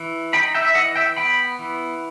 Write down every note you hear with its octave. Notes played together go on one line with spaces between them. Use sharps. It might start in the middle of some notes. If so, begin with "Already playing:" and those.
Already playing: E3
D#4 G5 B5
E5 G5
E5
E3 D#5 F#5
E5 G5
B3 G5 B5
E3